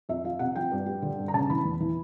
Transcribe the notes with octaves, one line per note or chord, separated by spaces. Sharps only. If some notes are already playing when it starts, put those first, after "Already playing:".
F2 E5
F3 F5
C3 F#5
F3 G5
G2
G3
D3
G2
A#5
C#3 A5
E3 B5
E2
E3